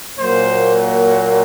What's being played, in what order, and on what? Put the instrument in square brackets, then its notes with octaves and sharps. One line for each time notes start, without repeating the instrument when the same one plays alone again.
[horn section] A#2 F#3 A#3 C5